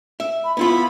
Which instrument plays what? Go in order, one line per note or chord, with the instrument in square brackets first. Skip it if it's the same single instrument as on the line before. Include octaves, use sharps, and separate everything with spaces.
[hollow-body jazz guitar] E5
[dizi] B5
[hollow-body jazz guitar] B3 E4 F4 [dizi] B5